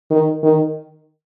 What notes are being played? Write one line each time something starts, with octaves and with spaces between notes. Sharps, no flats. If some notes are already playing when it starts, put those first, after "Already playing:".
D#3
D#3